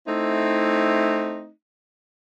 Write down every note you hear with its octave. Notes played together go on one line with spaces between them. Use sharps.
A3 C4 D#4 E4